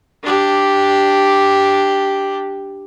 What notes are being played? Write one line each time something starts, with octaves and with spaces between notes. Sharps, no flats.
D4 G4